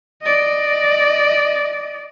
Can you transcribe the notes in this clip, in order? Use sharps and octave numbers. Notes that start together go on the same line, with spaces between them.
D5 D#5